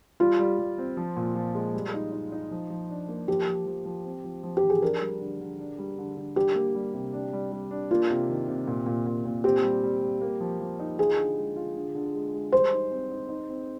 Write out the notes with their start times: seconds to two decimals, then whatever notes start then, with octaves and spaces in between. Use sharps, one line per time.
0.20 G3 F4
0.39 G3
0.59 G3
0.78 C4
0.97 F3
1.16 A#2
1.35 F3
1.55 G#3
1.74 G3
1.93 D#4
2.12 D#4
2.32 D#4
2.51 F3
2.70 F3
2.90 D4
3.08 A#3
3.28 F3 G4
3.48 F3
3.66 F3
3.85 F3
4.05 C4
4.24 F3
4.43 F3
4.57 G4
4.63 F3
4.70 G#4
4.82 D4 A#4
5.01 G3
5.20 D3
5.40 D3
5.59 D4
5.78 G3
5.98 D3
6.17 D3
6.36 G3 G4
6.55 A#3
6.75 G3
6.94 C3
7.13 D4
7.33 G3
7.52 G3
7.71 D4
7.91 A#3 F4
8.10 C3
8.29 D#3
8.48 C3
8.67 A#2
8.86 A#2
9.06 A#2
9.26 A#2
9.44 C4 G4
9.63 G3
9.84 G3
10.02 G3
10.21 A#3
10.40 F3
10.60 F3
10.79 D#4
10.99 F4 G#4
11.18 D3
11.37 G#3
11.56 F4
11.76 D3
11.95 D3
12.15 G#3
12.33 G#3
12.52 G3 C5
12.72 D#4
12.91 C4
13.11 D#4
13.29 D#4
13.49 C4